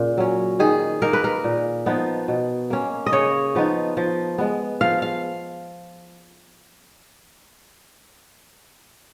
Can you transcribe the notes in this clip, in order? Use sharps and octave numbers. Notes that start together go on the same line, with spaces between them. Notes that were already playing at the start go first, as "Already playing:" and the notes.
Already playing: A#2 C#3
F#3 C#4
D#3 G#4
A#3 D#4 A#4
B4
A#4
A#2
F3 B3 D#4
B2
A#3 C#4
D#5
C#3 C#5
F3 B3 D#4
F3
G#3 B3
F3 F5
F5